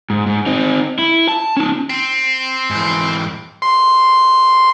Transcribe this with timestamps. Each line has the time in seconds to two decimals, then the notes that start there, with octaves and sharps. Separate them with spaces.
0.10 G#2
0.26 G#2
0.46 C4 D#4
0.99 E4
1.29 A5
1.57 C#4 D#4
1.90 C4
2.70 G#2 E3
3.62 C6